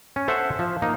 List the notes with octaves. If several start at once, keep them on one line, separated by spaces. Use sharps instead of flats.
C#4
A4 C5 E5 F#5
F3
A#3 D#4